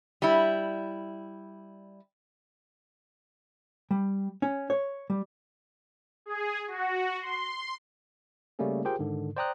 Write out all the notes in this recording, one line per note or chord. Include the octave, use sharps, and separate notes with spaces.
G3 E4
G3
C#4
C#5
G3
G#4
F#4
C6
C#3 G3 A3 A#3 C#4 G#4
F4 G4 G#4 A#4 C5 G5
G#2 D3 D#3
C5 D5 G5 A#5 D#6 F#6